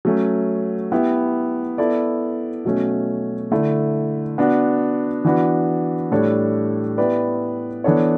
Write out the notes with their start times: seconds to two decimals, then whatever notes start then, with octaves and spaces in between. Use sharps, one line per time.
0.05 F#3 A3 C#4
0.92 B3 E4 G4
1.78 B3 E4 A4 D5
2.65 B2 F#3 A3 C#4
3.52 D3 A3 E4
4.38 B3 D4 F#4
5.25 E3 B3 D4 F#4 B4
6.11 A2 G3 D4 A4 C#5
6.98 B3 E4 G4 B4 D5
7.84 E3 B3 D4 A4 C#5